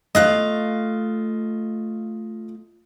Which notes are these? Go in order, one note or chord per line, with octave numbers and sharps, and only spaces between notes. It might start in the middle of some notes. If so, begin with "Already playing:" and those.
A3 F4 D#5 F5 F#6